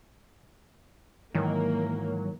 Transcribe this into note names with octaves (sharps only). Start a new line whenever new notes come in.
G#2 D#3 E3 F#3 A#3